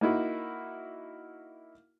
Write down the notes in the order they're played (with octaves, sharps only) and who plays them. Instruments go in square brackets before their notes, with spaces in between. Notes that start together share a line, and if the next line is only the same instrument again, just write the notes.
[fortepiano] A#3 D#4 E4 F#4